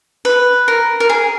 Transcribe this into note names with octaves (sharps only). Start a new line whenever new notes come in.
B4
A#4
A#4
G#4